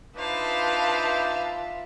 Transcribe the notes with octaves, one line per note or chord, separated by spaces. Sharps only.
D4 D#4 F4 B4 C5 E5 F5 A5